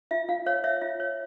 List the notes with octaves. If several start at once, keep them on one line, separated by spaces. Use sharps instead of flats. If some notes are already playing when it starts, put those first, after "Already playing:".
F4 E5
F4 F5
C#5 F5
C#5 E5
F4 E5
C#5